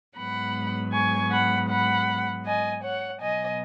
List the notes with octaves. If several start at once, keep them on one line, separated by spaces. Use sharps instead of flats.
G#2 F#3 B3 F#5 B5
G#5 C#6
F#5 B5
F#5 B5
D#5 G#5
C#5 F#5
B2 F#3 B3 D#5 G#5